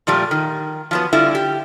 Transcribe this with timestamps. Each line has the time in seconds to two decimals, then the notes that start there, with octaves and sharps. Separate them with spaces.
0.07 A#2 F3 G3 A3
0.31 D#3
0.91 F3 F#3 B3
1.13 D3 G3 E4 F4
1.35 G4